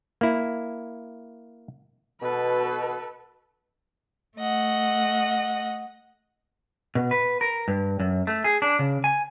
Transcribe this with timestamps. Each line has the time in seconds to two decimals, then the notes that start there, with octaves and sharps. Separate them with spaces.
0.21 A#3 E4
2.22 B2 A4 B4
4.38 A3 D#5 F#5
6.95 B2
7.11 B4
7.41 A#4
7.68 G2
8.00 F#2
8.27 A3
8.44 G#4
8.62 D4
8.79 C#3
9.04 G#5